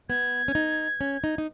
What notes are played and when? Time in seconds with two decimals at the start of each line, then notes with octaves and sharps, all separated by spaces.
0.09 B3 G#6
0.48 C#4
0.55 D#4
1.01 C#4
1.24 D#4
1.38 D#4